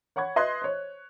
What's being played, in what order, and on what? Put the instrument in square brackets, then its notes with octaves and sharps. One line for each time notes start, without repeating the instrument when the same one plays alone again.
[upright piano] C#5 F#5 B5 C#6 G#6
B4 D#5 E5 C6 F#6 G#6
C5 C#5